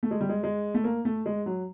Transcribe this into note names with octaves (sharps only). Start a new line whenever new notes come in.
A3
G#3
G3
G#3
G#3
A3
A#3
A3
G#3
F#3